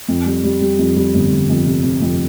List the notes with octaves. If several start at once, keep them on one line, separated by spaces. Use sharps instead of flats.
F2
G3
G3
G3
F2
G3
G1
G1
F2
C3
C3
F2